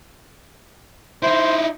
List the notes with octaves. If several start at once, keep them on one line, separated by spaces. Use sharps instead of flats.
D#4 E4 C5